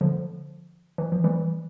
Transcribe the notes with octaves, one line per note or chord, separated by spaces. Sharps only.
D3 F3
E3
F3
E3 G3